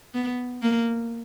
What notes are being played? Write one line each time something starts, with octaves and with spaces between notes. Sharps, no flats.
B3
A#3